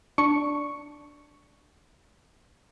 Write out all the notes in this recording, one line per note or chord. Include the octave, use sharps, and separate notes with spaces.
D4 C#6 C#7